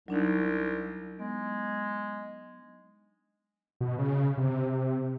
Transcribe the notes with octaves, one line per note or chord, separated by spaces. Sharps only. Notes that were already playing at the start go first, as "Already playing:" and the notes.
C2 F#3 D4 D#4
G#3 B3
B2
C#3
C3